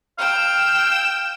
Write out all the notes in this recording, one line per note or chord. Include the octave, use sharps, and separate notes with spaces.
F5 G5 E6